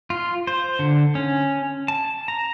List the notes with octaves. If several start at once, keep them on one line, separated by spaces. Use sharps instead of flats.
F4
C5
D3
C#4
A5
A#5